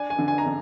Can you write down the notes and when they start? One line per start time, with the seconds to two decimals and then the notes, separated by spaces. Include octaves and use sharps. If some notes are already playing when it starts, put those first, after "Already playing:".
Already playing: D4 G#5
0.10 G#5
0.19 D3
0.28 G#5
0.38 A#5
0.46 D3